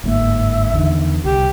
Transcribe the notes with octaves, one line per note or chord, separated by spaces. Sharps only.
G1 G#2 A#3 E5
E2 D3 D#3
C2 G4